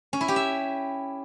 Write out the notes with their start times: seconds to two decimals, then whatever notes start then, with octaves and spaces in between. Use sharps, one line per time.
0.13 C#4
0.21 E4
0.28 G4
0.36 E5